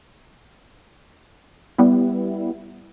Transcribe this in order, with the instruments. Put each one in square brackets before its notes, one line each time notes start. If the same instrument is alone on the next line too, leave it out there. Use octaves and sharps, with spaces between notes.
[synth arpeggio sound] G3 B3 E4